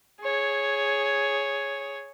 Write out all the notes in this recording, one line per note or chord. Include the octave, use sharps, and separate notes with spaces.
G#4 C#5